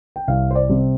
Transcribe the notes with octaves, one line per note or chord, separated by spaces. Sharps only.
G5
C2 F5
C5
D5
C3 G3 C4